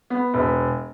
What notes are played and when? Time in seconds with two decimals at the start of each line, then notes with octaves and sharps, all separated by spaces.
0.10 B3
0.34 E1